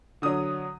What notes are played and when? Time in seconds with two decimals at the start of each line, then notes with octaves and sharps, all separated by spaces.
0.22 D3 F#3 D#6